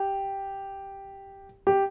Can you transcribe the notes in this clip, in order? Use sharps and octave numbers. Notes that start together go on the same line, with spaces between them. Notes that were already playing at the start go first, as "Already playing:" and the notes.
Already playing: G4
G4